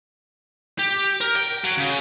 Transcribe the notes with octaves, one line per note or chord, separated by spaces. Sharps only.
G4
A#4
G5
F#3
C#3